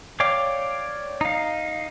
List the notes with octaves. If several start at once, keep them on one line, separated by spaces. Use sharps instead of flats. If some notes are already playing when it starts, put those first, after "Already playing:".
C#5 D5 F5 G5 D6
D#4 F5